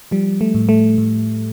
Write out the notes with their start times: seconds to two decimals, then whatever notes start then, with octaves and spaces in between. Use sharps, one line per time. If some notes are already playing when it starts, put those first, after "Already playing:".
0.11 F3 G3
0.41 A3
0.54 A2
0.69 A3
0.98 A2